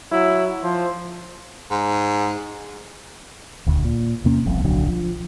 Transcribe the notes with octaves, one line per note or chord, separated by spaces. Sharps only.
F#3 E4
F3 C5
G#2
D#1 D2
A#2
E2 C3 A#3 C#4
F1 C2 F2
D1 B1 D3 F#3
F3